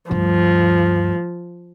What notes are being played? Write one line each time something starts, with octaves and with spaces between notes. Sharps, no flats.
D2 G2 F3